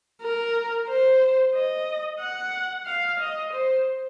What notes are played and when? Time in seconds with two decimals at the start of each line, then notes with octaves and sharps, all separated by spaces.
0.22 A#4
0.88 C5
1.54 D#5
2.20 F#5
2.86 F5
3.20 D#5
3.53 C5